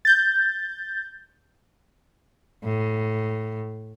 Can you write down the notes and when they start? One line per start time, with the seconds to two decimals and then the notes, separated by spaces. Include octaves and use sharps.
0.05 G6 A6
2.63 A2